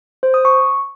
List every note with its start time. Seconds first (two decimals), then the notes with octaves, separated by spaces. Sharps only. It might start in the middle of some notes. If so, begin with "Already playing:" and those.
0.23 C5
0.34 D#6
0.45 C#6